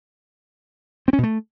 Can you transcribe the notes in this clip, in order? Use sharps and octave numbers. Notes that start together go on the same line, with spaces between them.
C4
C#4
B2
A3